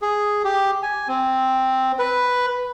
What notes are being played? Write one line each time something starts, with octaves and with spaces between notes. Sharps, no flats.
G#4
G4
G#5
C4
B4